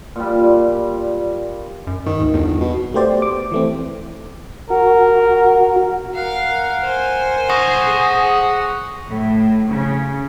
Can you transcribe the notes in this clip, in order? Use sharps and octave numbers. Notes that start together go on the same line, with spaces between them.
A#2 G3
F#2
G#2 D#3
D2
G1 E2
B2
A3 B3 G4 C5 D5
D6
E3 A3 C4
F#4 A#4
A#4 F5 F#5
C5 G#5
F#5 C6 C#6 D#6 A#6
G#4
A2
C#3